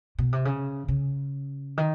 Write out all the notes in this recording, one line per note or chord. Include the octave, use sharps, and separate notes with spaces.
B2
C3
C#3
C#3
D#3